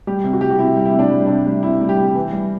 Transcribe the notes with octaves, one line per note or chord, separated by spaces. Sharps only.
G3 G4
C3
F#4
G3 G4
F#4
C3 E4
G3
E4
C3
D4
G3
C3 D4
G3
C3 E4
G3
G4
C3
E3
G3